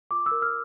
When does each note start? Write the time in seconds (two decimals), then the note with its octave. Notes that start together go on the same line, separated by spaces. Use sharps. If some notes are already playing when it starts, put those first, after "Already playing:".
0.11 F4 D6
0.26 E6
0.31 A#4
0.42 F6